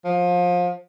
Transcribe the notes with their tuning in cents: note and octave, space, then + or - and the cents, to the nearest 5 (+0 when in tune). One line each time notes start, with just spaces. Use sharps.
F3 +25